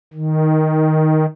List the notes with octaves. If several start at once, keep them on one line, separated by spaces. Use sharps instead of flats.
D#3